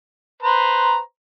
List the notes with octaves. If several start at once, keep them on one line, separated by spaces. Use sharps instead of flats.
B4 C5 A#5